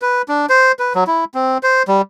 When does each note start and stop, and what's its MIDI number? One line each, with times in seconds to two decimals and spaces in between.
0.02 0.22 71
0.28 0.46 62
0.50 0.72 72
0.79 0.93 71
0.95 1.04 54
1.07 1.25 64
1.35 1.58 60
1.63 1.83 72
1.88 2.02 55